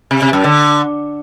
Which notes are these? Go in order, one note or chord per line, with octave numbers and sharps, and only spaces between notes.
C3
C3
F#2
D3